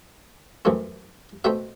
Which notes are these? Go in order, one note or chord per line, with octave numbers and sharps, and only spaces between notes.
F#2 E3 A3 C4
B2 A3 C4 E5 G5